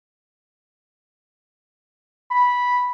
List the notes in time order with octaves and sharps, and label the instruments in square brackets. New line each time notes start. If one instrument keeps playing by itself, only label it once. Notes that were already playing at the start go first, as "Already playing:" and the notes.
[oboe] B5